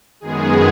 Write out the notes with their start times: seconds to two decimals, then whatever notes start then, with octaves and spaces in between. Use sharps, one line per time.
0.20 F#2 D#3 G#3 B3 G#4